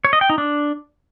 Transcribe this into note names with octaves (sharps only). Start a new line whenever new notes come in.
C#5
D#5
G5
D#4
D4